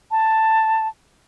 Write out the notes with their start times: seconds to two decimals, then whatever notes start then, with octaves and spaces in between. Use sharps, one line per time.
0.11 A5